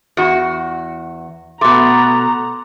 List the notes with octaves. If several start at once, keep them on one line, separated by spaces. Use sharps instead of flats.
E2 F#4
B2 A3 B3 A#5 C6 D6